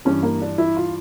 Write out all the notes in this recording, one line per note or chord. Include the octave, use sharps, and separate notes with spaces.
G2 E3 C#4
A#3
D4
E4
F4